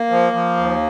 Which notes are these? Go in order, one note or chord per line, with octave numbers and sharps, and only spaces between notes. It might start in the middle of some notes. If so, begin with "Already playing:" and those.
Already playing: A#3
F3
F3
D#2